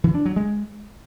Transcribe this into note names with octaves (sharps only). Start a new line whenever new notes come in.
E3
D4
F#3
G#3